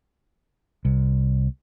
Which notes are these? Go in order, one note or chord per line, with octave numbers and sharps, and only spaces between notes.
C2